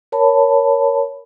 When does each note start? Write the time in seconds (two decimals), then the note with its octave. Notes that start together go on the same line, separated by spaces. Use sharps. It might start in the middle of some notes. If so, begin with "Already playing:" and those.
0.12 A#4 C#5 A5 B5